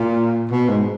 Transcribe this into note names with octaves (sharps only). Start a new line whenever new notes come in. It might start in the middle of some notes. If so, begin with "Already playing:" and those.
Already playing: A#2
B2
G#2